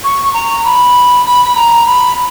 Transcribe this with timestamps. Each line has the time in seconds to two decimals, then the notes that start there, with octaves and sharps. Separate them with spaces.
0.04 C#6
0.34 A#5
0.64 B5
1.26 B5
1.45 B5
1.56 A#5
1.86 B5